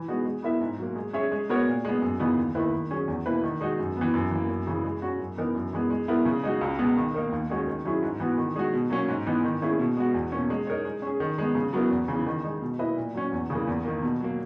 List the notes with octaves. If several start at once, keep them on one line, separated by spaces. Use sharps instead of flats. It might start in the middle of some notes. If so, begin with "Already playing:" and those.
Already playing: E3
G#3 B3 D#4 F#4
G#3
B3 E4 A#4 E5
G#2
F#3 A#3
G#3
C#4 G#4 C#5 E5
G#3
B3 F#4 A#4 C#5
A#2
G#3 B3
F#2
C#3 E3 B3 D#4
D#2
D#3 A#3 E4 B4
D#3
F#3 C#4 G#4
E2
B2 A#3 E4 B4
D#3
G#3 D#4 F#4
F#2
E3 B3
F#2
E3 A#3
F#2
C#3 E3
G#3
C#4 F#4
F#2
E3 B3 D#4 A#4
F#2
E3 G#3 B3
G#3
B3 E4 A#4
C#3
G#3 D#4 F#4
C#2
B2 G#3 B3
D#3
A#3 D#4 A#4
D#2
D#3 G#3 C#4 F#4
D#3
F#3 C#4 E4 G#4
G#2
E3 B3 F#4
D#3
G#3 D#4 F#4
B2
F#3 A#3 C#4
G#2
E3 B3 D#4
D#3
A#3 C#4 E4 G#4
B2
G#3 B3 F#4
E2
B2 A#3 C#4
G#3
D#4 A#4 C#5
G#3
C#4 G#4
D#3
G#3 B3
C#3
F#3 B3 E4 A#4
E2
C#3 E3
D#3
G#3 D#4
B2
A#3 E4 B4 D#5
A#2
F#3 C#4
E2
C#3 E3 A#3
E2
D#3 A#3
B2
F#3 A#3